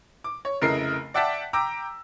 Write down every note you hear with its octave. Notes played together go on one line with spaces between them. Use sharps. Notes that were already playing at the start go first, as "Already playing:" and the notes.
D6
C#5
F1 C#3 E4 A#4 D#5 C7
D5 E5 F#5 G5 A5 B6
G5 A#5 D6 E6